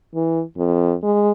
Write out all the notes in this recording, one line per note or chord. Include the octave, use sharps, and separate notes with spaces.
E3
F2
G#3